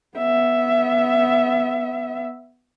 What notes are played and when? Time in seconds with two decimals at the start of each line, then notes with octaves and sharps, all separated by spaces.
0.18 B3 E5